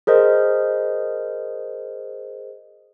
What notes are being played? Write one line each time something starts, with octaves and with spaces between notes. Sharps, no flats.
G#4 A#4 C5 D#5